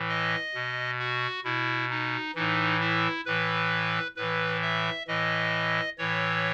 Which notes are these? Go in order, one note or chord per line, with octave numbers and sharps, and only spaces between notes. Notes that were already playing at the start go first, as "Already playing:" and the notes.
Already playing: A2 E3
D#5
B2
F#4
B2 E4
D#4
A2 E3 D#4
E4
A2 E3 B4
A2 E3 B4
E5
A2 E3 D#5
A2 E3 C#5